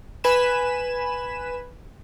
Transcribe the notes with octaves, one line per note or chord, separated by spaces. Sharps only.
B4 G#5 B5 E7